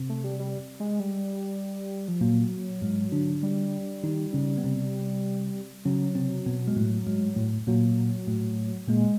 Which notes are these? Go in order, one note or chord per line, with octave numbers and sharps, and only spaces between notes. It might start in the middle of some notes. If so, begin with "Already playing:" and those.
Already playing: C3 C4
A3
G3
G3
G#3
G3
F3
A#2 F#3 A#3
G#2 G#3
D3 D4
G3
D#3 D#4
C#3 C#4
B3
C3 C4
C#3 F#3 C#4
C3 C4
B2 B3
G#3
A2 A3
G#2 G#3
A2 A3
A#2 F#3 A#3
A2 A3
A#2 G#3 A#3